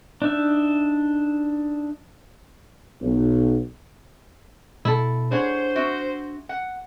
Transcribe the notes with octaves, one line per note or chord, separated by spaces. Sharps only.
D4 D#4 E5
B1
B2 E4 A4
D4 G#4 C5 C#5 F#5
C4 F#4 E5
F#5